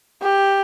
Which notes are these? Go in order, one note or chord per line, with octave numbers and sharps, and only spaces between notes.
G4